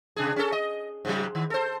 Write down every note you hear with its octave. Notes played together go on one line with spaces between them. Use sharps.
C3 D4 G#4
C#4 A4
D#5
G#2 C#3 F#3
D#3
A4 C5